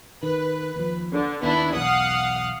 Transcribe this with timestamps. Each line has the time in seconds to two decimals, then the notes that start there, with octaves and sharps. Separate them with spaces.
0.23 D#3 B4
0.76 D#2 F3
1.13 D3
1.43 D#2 D#3 B3 D4 E4
1.76 B1 E2 F5 F#5 D#6